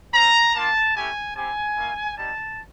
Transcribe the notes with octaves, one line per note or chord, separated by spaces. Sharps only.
C4 F4 A#5
A#3 D4 F4 A5
A3 C#4 E4 G4 G#5
C4 E4 G4 G#5
A#3 C#4 E4
G3 C4 D#4 G4 A5